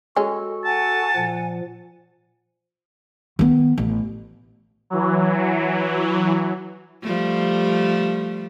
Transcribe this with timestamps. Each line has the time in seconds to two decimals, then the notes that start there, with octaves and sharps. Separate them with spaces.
0.16 G#3 C#4 F#4 A4
0.65 F#5 G#5 A5
1.16 A#2 F3
3.39 D#3 B3
3.78 A1
4.90 E3 F#3
7.02 F3 G3 A3